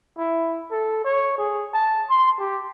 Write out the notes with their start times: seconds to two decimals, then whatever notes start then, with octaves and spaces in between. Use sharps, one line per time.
0.18 E4
0.71 A4
1.05 C#5
1.38 G#4
1.74 A5
2.10 C6
2.39 G4